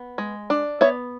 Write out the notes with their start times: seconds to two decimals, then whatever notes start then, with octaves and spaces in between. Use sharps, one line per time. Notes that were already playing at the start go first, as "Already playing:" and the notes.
Already playing: B3
0.18 G#3
0.50 D4
0.81 B3 C#5 E5